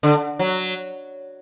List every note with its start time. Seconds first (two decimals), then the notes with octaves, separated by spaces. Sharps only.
0.03 D3
0.39 F#3